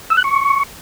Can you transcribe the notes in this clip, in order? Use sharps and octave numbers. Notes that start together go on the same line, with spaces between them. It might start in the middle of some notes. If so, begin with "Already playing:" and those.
E6
F#6
C#6